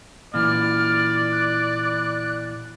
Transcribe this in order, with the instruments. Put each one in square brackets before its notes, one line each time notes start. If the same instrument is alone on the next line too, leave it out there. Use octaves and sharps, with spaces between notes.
[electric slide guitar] A#2 E3 [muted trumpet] D5 [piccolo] F6
[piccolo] F#6